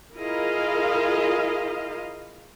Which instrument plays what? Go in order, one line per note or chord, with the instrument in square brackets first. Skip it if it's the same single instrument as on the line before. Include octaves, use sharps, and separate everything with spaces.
[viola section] E4 F4 G#4 A#4 D#5 F5